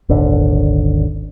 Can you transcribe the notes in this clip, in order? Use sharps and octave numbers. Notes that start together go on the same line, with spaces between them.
D#1 G#1 D3